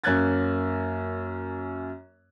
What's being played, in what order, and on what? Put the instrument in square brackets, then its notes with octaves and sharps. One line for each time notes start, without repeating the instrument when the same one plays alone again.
[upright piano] F#2 A#3 C#4 F#6 G#6 A6